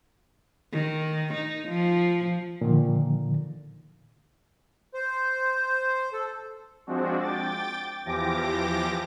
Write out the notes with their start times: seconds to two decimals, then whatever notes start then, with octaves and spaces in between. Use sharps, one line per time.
0.72 D#3
1.34 D#4
1.68 F3
2.61 A#2 D3 D#3 F3
4.94 C5
6.13 A4
6.87 F3 G#3 C4 D4 F#4
7.20 G5 D6 A6
8.06 E2 E3 F3 G4 D6 A#6